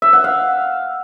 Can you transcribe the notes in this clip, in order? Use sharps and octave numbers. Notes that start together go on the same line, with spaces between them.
E5
F#5
F5